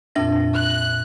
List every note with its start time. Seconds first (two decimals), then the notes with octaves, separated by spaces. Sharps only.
0.15 F2 A#2 C4 D4 E5 A#6
0.56 F#6